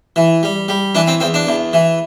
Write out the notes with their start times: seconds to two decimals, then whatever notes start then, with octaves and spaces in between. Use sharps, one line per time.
0.16 E3
0.43 G3
0.68 G3
0.95 E3 D4
1.07 C4
1.21 E2 C4
1.34 D4
1.47 E2
1.73 E3